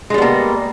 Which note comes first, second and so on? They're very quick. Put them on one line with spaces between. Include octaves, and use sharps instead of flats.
G#3 G3 B3 A#3